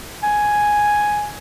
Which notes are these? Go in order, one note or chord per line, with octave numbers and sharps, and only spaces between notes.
G#5